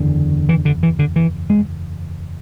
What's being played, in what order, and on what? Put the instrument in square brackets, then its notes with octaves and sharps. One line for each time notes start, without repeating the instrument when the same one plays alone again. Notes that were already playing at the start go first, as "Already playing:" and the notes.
Already playing: [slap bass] F#1 E2 D3
E3
D3
E3
D3
E3
G#3